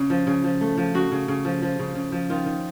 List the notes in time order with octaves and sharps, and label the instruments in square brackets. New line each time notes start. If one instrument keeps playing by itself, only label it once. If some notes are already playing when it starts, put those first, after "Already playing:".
Already playing: [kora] C#3
F3
C#3
F3
A3
F3
C#3 F#4
C#3
C#3
F3
F3
C#3
C#3
F3
D#3 F4
D#3